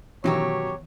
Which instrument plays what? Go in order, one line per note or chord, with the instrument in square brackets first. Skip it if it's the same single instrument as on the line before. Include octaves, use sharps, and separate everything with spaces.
[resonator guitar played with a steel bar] F#2 F#3 G4 [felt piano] B2 [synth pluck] D#3 E3 B3 [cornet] C#5